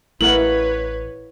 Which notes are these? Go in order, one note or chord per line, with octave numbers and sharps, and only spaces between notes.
A1 A3 E4 A#4 B4 C#5 F#5 F#7